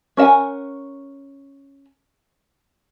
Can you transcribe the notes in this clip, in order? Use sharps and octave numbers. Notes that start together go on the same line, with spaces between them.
C#4 A#4 E5 F#5 G#5